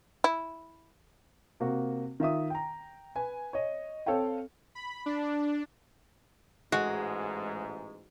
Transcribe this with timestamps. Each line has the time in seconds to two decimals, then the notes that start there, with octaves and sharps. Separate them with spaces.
0.24 E4
1.60 C3 A#3 F#4
2.20 D#3 F4 E5 D#6
2.50 G5 A#5
3.15 B4 G#5
3.53 C#5 D#5
4.06 C4 A4 C#5 F5 G5
4.75 B5
5.06 D4
6.72 A1 G#2 G#3 F#4